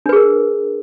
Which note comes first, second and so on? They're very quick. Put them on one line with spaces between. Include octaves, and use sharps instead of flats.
D4 B4 G#4 A#4